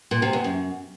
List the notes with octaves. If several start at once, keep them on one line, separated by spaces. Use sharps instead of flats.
A#2
C3
E2
F#2